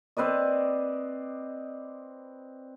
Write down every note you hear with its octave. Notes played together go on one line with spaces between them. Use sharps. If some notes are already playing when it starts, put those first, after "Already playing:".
C4 B4 D5 D#5